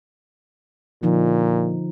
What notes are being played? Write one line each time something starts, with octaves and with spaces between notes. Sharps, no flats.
A#2 D3 F3 D#4